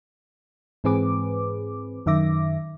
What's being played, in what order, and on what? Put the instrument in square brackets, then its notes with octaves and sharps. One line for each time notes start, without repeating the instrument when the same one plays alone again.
[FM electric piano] G#2 E3 C4 G#4 B4 D6
F#2 D#3 E5 D6 A#6